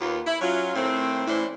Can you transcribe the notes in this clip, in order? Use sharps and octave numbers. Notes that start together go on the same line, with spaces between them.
D#2 B3 F4
E4
F#3 C#4 F4
A2 D#3 A3 C4
A2 E3 C#4 D4 E4 C5